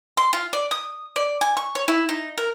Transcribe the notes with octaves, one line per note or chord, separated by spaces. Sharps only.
C6
F4
D5
D#6
D5
G#5
C#6
C#5
E4
D#4
A#4